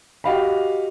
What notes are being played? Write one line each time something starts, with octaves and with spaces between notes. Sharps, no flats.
F#4 G4 D#5 F5 F#5 B5